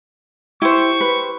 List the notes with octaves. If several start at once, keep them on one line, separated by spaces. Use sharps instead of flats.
E4 G4 C5 C#6
B4